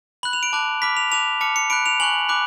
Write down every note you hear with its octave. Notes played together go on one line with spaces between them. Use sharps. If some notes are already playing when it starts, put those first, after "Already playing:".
B5 F#6 F#7
F7
D7
A5 D6 F#6
B5 D6 F6 B6
F7
A5 D6 F#6 F7
A5 D6 F6 C#7
C#7
B5 F#6 D7
F7
G#5 C#6 F#6 F#7
B5 D6 F#6